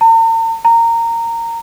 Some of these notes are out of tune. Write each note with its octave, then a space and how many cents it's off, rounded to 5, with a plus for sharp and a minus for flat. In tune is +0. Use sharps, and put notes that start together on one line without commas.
A#5 -45
A#5 -15